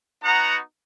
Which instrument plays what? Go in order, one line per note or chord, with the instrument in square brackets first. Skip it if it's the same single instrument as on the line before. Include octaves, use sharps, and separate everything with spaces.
[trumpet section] B3 D#4 F#4 F#5 A#5